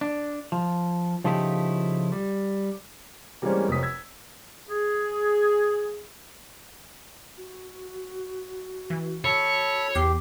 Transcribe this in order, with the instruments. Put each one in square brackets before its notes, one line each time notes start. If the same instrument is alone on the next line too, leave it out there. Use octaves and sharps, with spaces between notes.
[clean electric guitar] D4
F3
C#3 F3 A3 D#4 E4 G4
G3
[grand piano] E3 G3 G#3 A#3 C4 C#4
F1 F3 C#5 D#6 B6
E6 G#6 B6
[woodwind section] G#4
[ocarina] F#4
[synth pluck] E3
[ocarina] F#4 [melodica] A4 B5 [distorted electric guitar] C#5
[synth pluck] E2 C6 C7 [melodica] G4